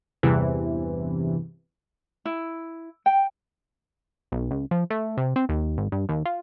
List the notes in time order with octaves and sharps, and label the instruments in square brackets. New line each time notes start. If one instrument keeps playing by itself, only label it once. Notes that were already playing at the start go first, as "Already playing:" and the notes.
[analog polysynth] E2 G2 C3 E3
[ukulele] E4
G5
[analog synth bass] B1
C#2
F3
A3
C3
C4
D#2
G#1
G2
D#2
F4